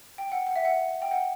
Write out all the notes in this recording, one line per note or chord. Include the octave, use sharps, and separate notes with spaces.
G5
F#5
F#5
E5
F#5
G5
F#5